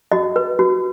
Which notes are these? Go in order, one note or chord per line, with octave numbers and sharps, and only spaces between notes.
F#4 D#5
B4
F#4